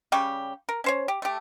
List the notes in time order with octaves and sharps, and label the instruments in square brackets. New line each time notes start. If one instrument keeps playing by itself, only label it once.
[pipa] C#3 G3 G4 C#6
A#4
C#4 C5 C#5
G4
A3 G4